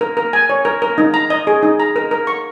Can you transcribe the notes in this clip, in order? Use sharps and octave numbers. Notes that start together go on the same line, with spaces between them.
A#4
A#4
G#5
C#5
A#4
A#4
D#4
A#5
D#5
G#4
D#4
A#5
A#4
A#4
C#6